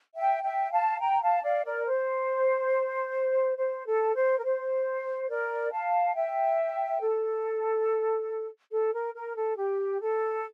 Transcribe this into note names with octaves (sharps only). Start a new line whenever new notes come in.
E5 G5
E5 G5
F5 A5
G5 A#5
F5 A5
D5 F5
A#4 D5
C5
C5
A4
C5
A#4
C5
A#4 D5
F5 A5
E5 G5
A4
A4
A#4
A#4
A4
G4
A4